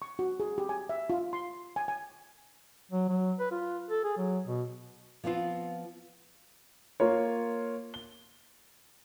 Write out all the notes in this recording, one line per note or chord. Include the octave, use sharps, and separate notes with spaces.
C#6
F#4
G#4
G4
G#5
E5
F4
C6
G#5
G#5
F#3
F#3
B4
F4
A4
G#4
F#3
B2
F3 B3 C4 F4
A#3 F4 C#5
G7